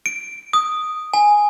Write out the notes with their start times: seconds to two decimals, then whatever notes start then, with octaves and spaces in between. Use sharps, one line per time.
0.06 D7
0.53 D#6
1.14 G#5